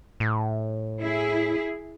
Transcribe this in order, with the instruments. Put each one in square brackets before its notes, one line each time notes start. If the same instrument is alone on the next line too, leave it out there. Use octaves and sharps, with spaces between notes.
[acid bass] A2
[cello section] E4 G#4